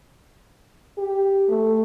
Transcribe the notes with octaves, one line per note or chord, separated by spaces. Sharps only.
G4
A3